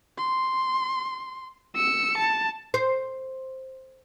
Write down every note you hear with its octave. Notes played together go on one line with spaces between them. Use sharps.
C6
E6 C#7
A5
C5